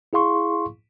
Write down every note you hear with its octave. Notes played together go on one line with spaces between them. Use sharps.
E4 G#4 F5 C6 C#6